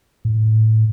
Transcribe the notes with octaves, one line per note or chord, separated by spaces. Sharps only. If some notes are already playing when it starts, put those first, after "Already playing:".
A2